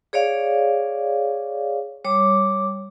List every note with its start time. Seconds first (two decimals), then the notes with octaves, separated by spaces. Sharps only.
0.13 G#4 C#5 D5 F5
2.05 G3 C#5 D6